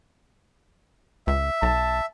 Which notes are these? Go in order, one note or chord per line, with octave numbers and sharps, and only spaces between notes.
C#2 E5
B1 A5